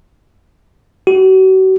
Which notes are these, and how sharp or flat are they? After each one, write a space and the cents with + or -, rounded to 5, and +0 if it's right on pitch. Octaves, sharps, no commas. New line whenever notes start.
F#4 +40